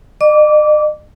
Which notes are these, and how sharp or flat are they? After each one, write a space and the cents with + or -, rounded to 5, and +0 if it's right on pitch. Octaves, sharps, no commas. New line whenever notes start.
D#5 -45 D6 -20